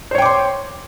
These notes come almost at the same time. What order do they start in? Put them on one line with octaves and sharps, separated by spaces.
C5 C#5 G5 D6 C6